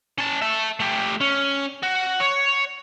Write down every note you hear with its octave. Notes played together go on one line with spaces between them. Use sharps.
C#4 A5
E5 A5
A3 G4
C#4
F#4
C#5